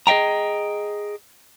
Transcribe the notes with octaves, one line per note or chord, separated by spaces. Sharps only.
G#4 D#5 E5 G5 A#5